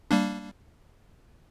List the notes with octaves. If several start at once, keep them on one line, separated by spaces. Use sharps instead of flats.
G3 A#3 D4